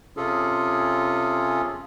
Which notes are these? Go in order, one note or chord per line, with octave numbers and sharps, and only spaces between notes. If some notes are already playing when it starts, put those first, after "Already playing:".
C3 C#4 F4 G#4 A4